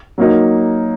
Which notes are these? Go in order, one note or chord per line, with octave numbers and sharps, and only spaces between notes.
F#3 A#3 D#4